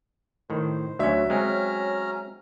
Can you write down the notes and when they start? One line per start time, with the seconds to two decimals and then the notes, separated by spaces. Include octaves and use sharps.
0.50 A2 D#3 C5
0.99 D2 F#3 C#4 E5
1.30 G#3 C4 C#4 A#5 F6